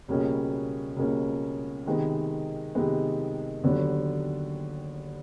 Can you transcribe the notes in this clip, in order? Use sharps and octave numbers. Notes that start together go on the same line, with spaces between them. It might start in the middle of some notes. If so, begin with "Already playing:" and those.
C#2 B2 G3 A#3 C#4
C#2 B2 G3 A#3 C#4
C3 D#3 G#3 B3
C3 D#3 G#3 B3
D#2 D3 F#3 B3 D4